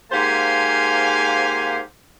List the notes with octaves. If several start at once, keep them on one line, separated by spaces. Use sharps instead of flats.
G#2 A#3 G4 C5 F5 G#5